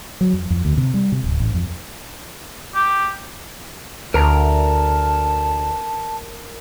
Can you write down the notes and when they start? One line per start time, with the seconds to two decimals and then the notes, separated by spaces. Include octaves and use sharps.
0.21 F#3
0.33 F2
0.50 F2
0.65 D2
0.77 C3
0.94 G3
1.12 C3
1.24 D1
1.40 A1
1.54 F2
2.75 G4
4.14 D2 A#4 A5 A#5